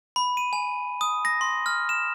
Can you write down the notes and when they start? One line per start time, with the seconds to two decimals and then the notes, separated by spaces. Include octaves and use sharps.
0.16 B5
0.37 D#7
0.53 G#5
1.01 D#6
1.25 A#6
1.41 C6
1.66 F6
1.89 E7